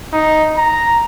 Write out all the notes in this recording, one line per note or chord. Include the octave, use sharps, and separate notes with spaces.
D#4
A#5